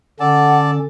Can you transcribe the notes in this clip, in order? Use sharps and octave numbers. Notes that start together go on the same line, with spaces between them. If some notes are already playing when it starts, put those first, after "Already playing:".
D3 C#4 A4 D5 F#5 A5